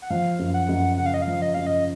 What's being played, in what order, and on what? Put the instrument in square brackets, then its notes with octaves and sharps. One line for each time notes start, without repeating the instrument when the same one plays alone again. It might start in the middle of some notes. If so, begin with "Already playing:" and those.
[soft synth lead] F#5
[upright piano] F3 [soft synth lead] F5
[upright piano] F#2
[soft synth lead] F#5
[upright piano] F#2
[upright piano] C#3 [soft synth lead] F#5
[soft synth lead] F5
D#5
F5
[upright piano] F3
[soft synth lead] D#5
[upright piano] F#2 [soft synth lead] F5
[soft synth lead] D#5